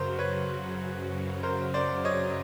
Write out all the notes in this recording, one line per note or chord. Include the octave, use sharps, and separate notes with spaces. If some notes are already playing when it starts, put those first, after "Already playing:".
Already playing: F#2 C#3 F#3 A#4 C5
B4 C#5
A#4 C5
C5 D5
C#5 D#5